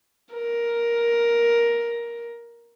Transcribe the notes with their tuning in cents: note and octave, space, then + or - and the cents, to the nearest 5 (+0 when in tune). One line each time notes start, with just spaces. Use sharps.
A#4 +10